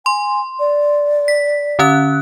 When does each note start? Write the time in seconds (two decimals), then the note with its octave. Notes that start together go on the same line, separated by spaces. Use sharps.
0.06 G#5 C6
0.60 D5
1.28 B6
1.79 D3 C#4 F#6